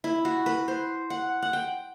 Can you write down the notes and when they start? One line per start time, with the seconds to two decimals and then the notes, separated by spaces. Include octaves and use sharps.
0.04 E4
0.25 F#4
0.46 B4
0.68 C5
1.10 F#5
1.42 F#5
1.53 G5